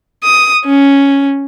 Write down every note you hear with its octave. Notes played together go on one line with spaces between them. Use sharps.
D#6
C#4